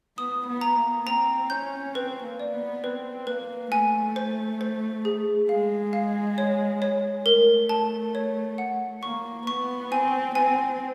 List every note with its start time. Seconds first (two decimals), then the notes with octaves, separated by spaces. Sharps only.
0.18 B3 D#6
0.48 B3
0.61 A#5
0.77 A#3
1.06 C4 A#5
1.50 C#4 G6
1.95 C4 B4
2.24 A#3
2.40 D5
2.53 B3
2.83 C4 B4
3.27 A#3 B4
3.72 A3 G#5
4.16 C5
4.61 C5
5.05 G#4
5.49 G#3 F5
5.93 F5
6.38 C#5
6.82 C#5
7.26 A3 A#4
7.69 A5
8.15 C#5
8.58 F#5
9.03 A#3 C#6
9.47 B3 C#6
9.91 C4 G#5
10.35 C4 G#5